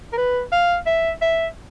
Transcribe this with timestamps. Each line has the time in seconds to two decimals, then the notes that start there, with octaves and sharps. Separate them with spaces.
0.13 A#4
0.17 B4
0.52 F5
0.87 E5
1.22 E5